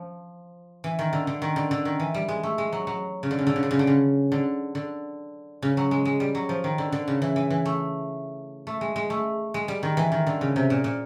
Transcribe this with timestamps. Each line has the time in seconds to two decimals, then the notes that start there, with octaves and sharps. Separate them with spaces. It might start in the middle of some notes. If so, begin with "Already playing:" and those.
Already playing: F3
0.84 E3
0.99 D#3
1.13 D3
1.27 D3
1.42 D#3
1.56 D3
1.71 D3
1.85 D#3
2.00 E3
2.14 G3
2.28 G#3
2.43 A3
2.58 G#3
2.72 F#3
2.87 F#3
3.23 C#3
3.31 D3
3.39 C#3
3.47 D3
3.56 C#3
3.63 D3
3.71 C#3
3.79 D3
3.87 C#3
4.32 D3
4.75 D3
5.62 C#3
5.77 F#3
5.91 G#3
6.05 G#3
6.20 G3
6.35 F#3
6.49 F3
6.64 D#3
6.78 D3
6.92 D3
7.08 C#3
7.22 E3
7.36 E3
7.50 E3
7.65 A3
8.67 A3
8.81 G#3
8.96 G#3
9.10 A3
9.54 G#3
9.68 G3
9.83 D#3
9.97 E3
10.12 D#3
10.26 D3
10.41 C#3
10.56 C3
10.70 A#2
10.84 A#2